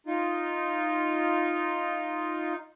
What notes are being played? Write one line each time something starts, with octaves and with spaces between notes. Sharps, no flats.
D#4 F4